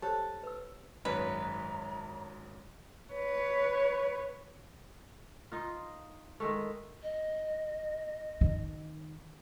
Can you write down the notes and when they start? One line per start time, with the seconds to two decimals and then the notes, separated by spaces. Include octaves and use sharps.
0.02 G4 A4 C5 C#5
0.44 B4 E6
1.05 G#1 F#2 B4 C#5 A#5
3.13 B4 C#5
5.52 D#4 F4
6.40 D#3 G#3 A3
7.02 D#5
8.41 D#3